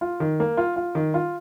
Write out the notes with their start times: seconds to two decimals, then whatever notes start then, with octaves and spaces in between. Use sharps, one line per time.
0.01 F4
0.20 D#3
0.40 A#3
0.57 F4
0.76 F4
0.95 D#3
1.14 F4